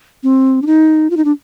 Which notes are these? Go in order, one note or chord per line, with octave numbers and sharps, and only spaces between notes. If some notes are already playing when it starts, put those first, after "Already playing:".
C4
D4
D#4
F4
D#4
D4